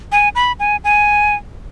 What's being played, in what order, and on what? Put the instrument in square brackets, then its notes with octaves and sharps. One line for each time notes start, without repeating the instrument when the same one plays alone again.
[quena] G#5
B5
G#5
G#5